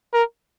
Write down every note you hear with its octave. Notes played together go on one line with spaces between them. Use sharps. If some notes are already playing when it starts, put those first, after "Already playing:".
A#4